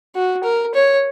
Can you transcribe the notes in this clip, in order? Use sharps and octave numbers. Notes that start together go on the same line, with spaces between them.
F#4
A#4
C#5